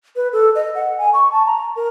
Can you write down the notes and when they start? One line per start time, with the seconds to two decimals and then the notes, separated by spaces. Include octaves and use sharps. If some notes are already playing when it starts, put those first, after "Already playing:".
0.16 B4
0.33 A4
0.55 D#5
0.75 F#5
0.98 G#5
1.14 C#6
1.32 A5
1.46 A#5
1.76 A#4